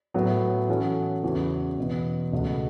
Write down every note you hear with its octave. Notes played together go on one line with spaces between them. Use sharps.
A2 F#3 B3 F#4 A4
E3 C#4 F#4 A4
E2 C#3 E3 B3 F#4
E2 B2 B3
C#2 B2 A3 F#4